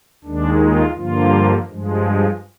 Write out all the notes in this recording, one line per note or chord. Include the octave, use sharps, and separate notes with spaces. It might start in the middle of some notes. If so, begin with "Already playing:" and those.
D#2 D#3 G#3 D4
F4
G2 D3 F3 A#3 F4
G2 F3 G#3